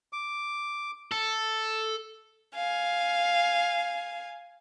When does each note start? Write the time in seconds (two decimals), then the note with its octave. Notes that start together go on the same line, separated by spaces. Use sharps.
0.13 D6
1.12 A4
2.55 F5 G#5